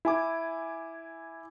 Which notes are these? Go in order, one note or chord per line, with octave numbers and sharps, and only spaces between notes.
E4 G#5 D6